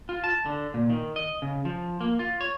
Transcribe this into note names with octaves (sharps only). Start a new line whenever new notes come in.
F4
A5
D3
A#2
D#3
D#5
C#3
F3
A#3
F4
C#5